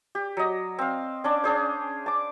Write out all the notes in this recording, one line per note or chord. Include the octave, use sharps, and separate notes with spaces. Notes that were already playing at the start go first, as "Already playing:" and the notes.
G4
F#3 D#5
C4 F5
C#4 D4 D6
C#4 D4 G#4 C5
A5 D6